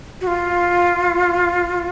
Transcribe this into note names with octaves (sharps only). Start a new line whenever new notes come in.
F#4
F4